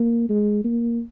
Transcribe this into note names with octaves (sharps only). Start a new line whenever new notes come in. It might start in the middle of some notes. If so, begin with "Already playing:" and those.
Already playing: A#3
G#3
A#3